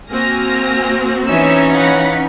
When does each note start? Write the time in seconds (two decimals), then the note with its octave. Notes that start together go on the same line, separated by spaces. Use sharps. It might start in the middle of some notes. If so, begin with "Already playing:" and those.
0.10 A#3 C4 F#4 G#5 F6 A#6
1.26 E3 C#4 D#4 E5 G#5 E6
1.72 F5 F#5 B5